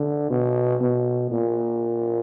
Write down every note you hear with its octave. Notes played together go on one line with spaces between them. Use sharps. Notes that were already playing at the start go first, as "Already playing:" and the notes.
Already playing: D3
B2
B2
A#2